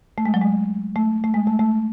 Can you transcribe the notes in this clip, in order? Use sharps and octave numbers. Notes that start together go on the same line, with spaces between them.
A3
G#3
F#3
G#3
A3
A3
G#3
A3
A3